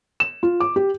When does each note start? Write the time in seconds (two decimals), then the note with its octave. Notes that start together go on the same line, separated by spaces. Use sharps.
0.20 E7
0.43 F4
0.60 D6
0.76 G4